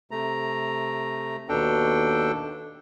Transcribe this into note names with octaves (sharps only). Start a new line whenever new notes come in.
C3 A3 A#5
D#2 B2 D4 A4 G5